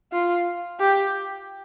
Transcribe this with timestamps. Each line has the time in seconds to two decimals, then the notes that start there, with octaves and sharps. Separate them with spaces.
0.12 F4
0.80 G4